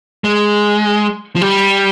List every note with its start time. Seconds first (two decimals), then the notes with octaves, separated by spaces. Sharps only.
0.24 G#3
1.36 F3
1.41 G3